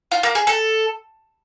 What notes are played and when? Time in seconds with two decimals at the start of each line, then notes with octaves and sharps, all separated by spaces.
0.12 F4
0.23 A#3
0.35 G#4
0.47 A4